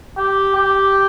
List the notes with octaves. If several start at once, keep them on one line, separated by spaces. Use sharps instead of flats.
G4
G4